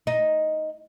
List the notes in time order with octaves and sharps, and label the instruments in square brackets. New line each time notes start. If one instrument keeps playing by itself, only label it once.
[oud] D#4